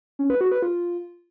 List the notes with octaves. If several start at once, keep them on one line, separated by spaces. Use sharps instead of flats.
C#4
B4
F#4
B4
F4